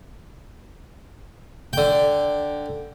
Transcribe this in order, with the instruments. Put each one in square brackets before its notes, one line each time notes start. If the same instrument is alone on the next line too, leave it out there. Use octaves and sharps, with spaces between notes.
[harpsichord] D3 G5